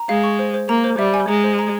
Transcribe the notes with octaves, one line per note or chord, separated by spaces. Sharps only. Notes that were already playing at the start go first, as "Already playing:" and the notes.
Already playing: A#5
G#3 F5
C#6
C5
C5
A#3 A#5
C5
G3 E5
G#5
G#3 A#5
C5
A#5